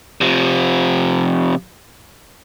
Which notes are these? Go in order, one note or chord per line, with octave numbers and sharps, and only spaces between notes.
C3 F3